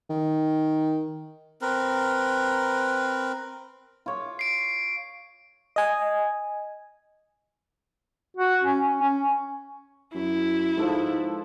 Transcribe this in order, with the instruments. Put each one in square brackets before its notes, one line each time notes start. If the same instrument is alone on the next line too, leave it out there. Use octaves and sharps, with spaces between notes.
[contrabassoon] D#3
[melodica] C4 A#4 B4
[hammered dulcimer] F4 C#5 D6
[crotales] C7 D7
[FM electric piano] D#5 G#5
[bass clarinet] F#4
C#4
C#4
C#4
[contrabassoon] F#2 [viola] E4
[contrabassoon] G#2 [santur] F3 A4 B4